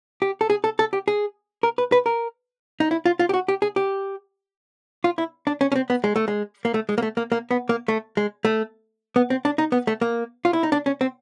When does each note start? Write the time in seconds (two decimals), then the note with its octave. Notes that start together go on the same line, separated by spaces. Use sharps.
0.22 G4
0.41 A4
0.50 G#4
0.64 A4
0.79 A4
0.93 G4
1.08 G#4
1.63 A#4
1.78 B4
1.92 B4
2.06 A#4
2.80 D#4
2.91 E4
3.06 F4
3.19 F4
3.29 G4
3.34 F#4
3.48 G4
3.62 G#4
3.76 G4
5.04 F4
5.18 E4
5.47 D4
5.61 C#4
5.72 C#4
5.76 C4
5.90 B3
6.04 G#3
6.16 A3
6.28 G#3
6.65 A#3
6.74 A3
6.89 G#3
6.98 A#3
7.02 A3
7.17 A#3
7.32 A#3
7.51 B3
7.69 A#3
7.88 A3
8.17 G#3
8.45 A3
9.16 B3
9.30 C4
9.45 D4
9.58 D#4
9.72 B3
9.87 A3
10.01 A#3
10.45 F4
10.53 E4
10.63 D#4
10.72 D4
10.86 C#4
11.01 C4